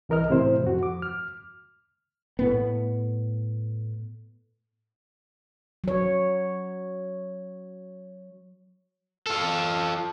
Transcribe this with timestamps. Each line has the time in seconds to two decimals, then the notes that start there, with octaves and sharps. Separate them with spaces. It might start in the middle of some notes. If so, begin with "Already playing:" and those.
0.09 C2 E3 A#4 D#5 F6
0.30 A2 C3 E4 C5
0.64 F2 F#4
0.83 D6
1.02 F6
2.39 A2 B3
5.84 F#3 C#5
9.26 F4 A4